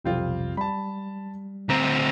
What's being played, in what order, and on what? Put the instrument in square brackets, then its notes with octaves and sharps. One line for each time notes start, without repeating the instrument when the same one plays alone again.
[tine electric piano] B1 F2 C3 [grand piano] G3 C4 F4
[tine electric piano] G3 [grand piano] A5 B5
[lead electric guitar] D2 C4 [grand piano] A#5